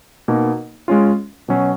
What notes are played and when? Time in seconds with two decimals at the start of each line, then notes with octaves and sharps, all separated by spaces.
0.28 B2 A#3 D#4
0.88 G#3 C#4 F4
1.48 B2 F#3 C#4